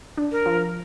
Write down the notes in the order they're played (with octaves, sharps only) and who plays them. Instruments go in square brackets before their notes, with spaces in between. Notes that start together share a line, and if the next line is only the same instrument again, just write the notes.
[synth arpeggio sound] D4
[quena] A#4
[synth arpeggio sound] F3